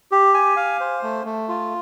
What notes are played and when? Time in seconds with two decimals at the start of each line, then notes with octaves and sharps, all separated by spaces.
0.12 G4
0.34 G#5
0.56 F5
0.80 C5
1.03 A3
1.25 A3
1.48 F4